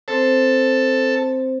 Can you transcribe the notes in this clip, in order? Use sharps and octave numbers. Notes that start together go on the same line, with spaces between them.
C4 A4 C5